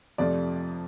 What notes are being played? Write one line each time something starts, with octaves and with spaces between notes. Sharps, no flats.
F2 C3 F3 A3 D5